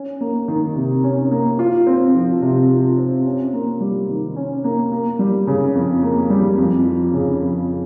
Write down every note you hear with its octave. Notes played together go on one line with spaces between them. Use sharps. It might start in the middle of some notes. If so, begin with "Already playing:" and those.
Already playing: C#4
A#3
D#3
C3
C#4
A#3
F4
C4
F3
C3
F4
C4
C#4
A#3
G3
D#3
C#4
A#3
A#3
G3
C#3
F2
A#3
G3
F2
F3
C#3
F2